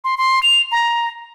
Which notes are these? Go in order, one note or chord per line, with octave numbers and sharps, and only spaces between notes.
C6
C6
F7
A#5